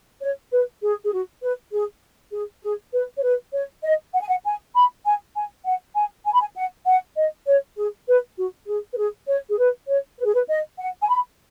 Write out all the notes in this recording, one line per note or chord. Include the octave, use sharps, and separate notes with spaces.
C#5
B4
G#4
G#4
F#4
B4
G#4
G#4
G#4
B4
C#5
B4
C#5
D#5
F#5
G#5
F#5
G#5
B5
G#5
G#5
F#5
G#5
G#5
B5
G#5
F#5
F#5
D#5
C#5
G#4
B4
F#4
G#4
B4
G#4
C#5
G#4
B4
C#5
B4
G#4
B4
D#5
F#5
G#5
B5